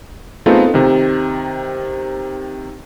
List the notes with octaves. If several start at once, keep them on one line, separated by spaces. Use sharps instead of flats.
A3 B3 C4 D#4 F4 G#4
C3 D#3